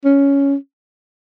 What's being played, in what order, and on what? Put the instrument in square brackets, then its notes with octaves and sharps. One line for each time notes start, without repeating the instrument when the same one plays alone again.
[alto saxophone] C#4